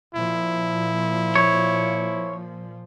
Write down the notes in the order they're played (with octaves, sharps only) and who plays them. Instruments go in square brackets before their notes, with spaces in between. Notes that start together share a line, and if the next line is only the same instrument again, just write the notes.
[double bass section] A#2 F3 [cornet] E4
[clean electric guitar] C#5